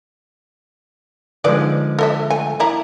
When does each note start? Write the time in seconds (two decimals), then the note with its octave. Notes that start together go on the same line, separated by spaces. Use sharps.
1.44 D3 F3 G#3 D#4 B4 D5
1.99 A4 D#5 E5
2.30 A3 G#5
2.60 A#3 E4 A#5